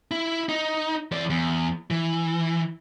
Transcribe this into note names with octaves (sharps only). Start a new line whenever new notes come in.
E4
D#4
E3 D5
E2
E3